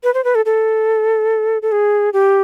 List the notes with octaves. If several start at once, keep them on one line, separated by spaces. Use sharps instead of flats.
B4
C5
B4
A4
A4
A4
G#4
G4